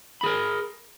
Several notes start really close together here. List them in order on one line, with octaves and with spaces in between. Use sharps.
B5 G#4 A#4